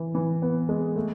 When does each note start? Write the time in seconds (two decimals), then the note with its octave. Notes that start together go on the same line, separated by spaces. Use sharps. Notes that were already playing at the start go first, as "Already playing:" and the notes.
Already playing: E3
0.15 E3
0.42 B3
0.69 G#3
0.96 A3